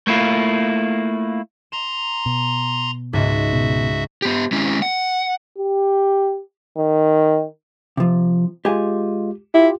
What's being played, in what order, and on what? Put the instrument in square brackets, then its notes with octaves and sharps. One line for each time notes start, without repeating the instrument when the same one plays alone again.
[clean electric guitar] A3 A#3 E4 F4
[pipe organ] A#5 C6 [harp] E7
[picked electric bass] B2
[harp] C#2 G#2 [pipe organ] F#4 E5
[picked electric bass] B2
[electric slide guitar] B3 G4
G#3 C#4 E4
F#5
[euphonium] G4
D#3
[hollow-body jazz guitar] C3 F3
[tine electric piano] G#3 F4 [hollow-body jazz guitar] G4 G#5
[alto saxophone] E4 [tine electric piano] F4 G4